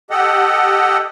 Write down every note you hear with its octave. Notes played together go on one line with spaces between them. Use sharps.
G4 A4 D#5 F#5